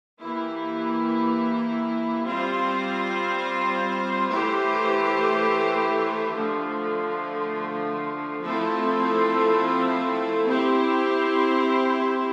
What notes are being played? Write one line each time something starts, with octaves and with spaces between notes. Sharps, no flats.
E3 A#3 E4 G4
G3 C4 F4 C5
E3 A3 E4 G4 C5
D3 F3 A3
F3 A3 C4 E4 A4
C4 E4 G4 C5